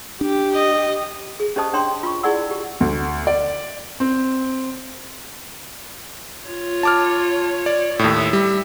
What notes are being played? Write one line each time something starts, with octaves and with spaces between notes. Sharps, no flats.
D4 G4
D#5
G#4
C#4 G4 C5 D#5 A5 D#6
D4 C#5 G5 C6
F4 C#6
E4 G#4 D5 F#5 E6
G4
D2
D5
C4
F4 C#5
A5 D6 F6
D5
D#2 A2 E5
G3